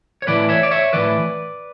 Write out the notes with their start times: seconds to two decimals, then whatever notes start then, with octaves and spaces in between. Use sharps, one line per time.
0.22 C#5
0.27 A2 E3 B4 D5
0.49 C#5 E5
0.63 D5
0.71 C#5 E5
0.93 A2 E3 B4 D5